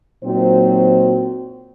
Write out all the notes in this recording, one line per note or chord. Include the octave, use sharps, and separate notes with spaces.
A#2 F#3 C4 D#4 F#4 C5